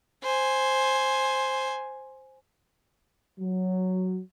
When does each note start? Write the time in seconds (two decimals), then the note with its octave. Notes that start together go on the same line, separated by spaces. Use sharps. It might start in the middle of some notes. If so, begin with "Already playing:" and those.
0.23 C5 G#5
3.40 F#3